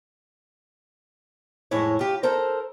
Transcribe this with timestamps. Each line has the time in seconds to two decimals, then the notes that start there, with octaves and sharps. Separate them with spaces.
1.71 F2 A2 G#3 E4 C#5
1.99 F4 G4
2.23 A4 A#4 C5